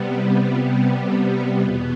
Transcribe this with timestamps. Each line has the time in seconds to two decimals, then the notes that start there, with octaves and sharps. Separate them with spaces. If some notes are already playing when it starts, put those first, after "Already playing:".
Already playing: C3 G3 B3
0.17 E4
0.46 F4
0.74 G4
1.03 A4
1.31 G4
1.60 E2 B2 B3 F4